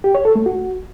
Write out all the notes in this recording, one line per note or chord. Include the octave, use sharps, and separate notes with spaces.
G4
C#5
A4
A3
F#4